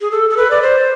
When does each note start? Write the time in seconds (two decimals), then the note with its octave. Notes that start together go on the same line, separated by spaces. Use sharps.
0.01 G#4
0.11 A4
0.30 A4
0.37 B4
0.51 D5
0.62 C5